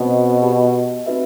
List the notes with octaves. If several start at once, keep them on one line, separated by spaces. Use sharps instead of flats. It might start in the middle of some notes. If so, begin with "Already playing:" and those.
Already playing: B2 C4 F#4 C5 D#5
G4 D#5 A5
C4 D#4 F#4 B4 E5